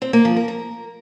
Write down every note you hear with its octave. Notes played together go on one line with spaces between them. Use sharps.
C4
A#3
F3
A#4
A#4